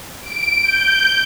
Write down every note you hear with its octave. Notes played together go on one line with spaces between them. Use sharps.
D7
G6